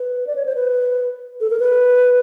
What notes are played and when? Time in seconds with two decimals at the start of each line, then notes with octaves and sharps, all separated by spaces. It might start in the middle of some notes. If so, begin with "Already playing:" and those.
Already playing: B4
0.27 D5
0.36 C#5
0.46 C5
0.55 B4
1.41 A4
1.50 A#4
1.60 B4